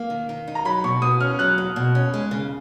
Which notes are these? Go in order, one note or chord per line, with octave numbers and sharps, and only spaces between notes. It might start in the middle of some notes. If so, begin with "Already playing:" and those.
Already playing: A#3 F5
D#3
D#3
D#4
A#5
F#3 B5
B2 C#6
B2 D#6
C#4 F6
F#3 F#6
B2
B2
C#4
G#3
C#3